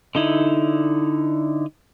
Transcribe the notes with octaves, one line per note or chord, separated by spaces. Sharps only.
D3 D#4 E4